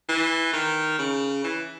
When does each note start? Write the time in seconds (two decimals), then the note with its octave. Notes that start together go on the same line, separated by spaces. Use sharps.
0.09 E3
0.53 D#3
0.98 C#3
1.44 E3